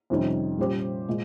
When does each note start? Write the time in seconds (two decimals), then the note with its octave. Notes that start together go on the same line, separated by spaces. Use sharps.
0.10 F2 C3 D#3 G3 C#4
0.58 A#2 G3 C#4 G4 C5
1.09 A#2 G#3